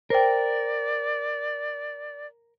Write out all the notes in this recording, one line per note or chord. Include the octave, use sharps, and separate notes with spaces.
A#4 C5 D5 G5